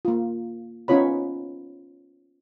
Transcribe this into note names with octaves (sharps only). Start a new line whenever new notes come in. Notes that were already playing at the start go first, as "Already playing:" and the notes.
A#3 F4
B3 C#4 D#4 F4 C#5 B5